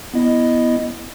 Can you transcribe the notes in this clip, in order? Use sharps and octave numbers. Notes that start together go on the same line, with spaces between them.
B3 E4 D#5